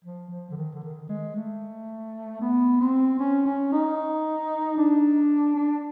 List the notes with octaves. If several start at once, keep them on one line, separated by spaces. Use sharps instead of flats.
F3
F3
D3
D#3
D3
D#3
G#3
A3
B3
C4
C#4
C#4
D#4
D4
D4